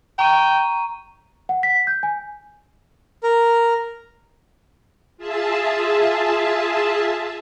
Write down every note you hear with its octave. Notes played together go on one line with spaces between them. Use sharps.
G5 A#5 C#6 D#7
F#5
B6
G6
G#5
A#4
F4 G#4 E5 A5